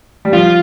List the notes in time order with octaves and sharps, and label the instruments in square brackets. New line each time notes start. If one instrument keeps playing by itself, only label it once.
[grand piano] G3
[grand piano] F3 [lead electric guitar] F4